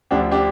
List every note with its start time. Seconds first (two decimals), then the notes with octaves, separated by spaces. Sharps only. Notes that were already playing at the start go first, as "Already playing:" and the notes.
0.11 D2 D3 F3 D4 G4
0.32 D4 G4